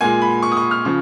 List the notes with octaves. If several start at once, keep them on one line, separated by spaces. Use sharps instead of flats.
A#2 G#3 G#5
B5
C#6
D#6
C#6
F6
C#3 F3 C#6